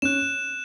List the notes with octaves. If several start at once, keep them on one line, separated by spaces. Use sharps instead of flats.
C#4 F#6 E7